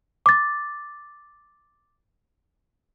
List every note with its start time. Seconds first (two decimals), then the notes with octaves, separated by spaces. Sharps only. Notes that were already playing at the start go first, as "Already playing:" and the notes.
0.26 D6 A6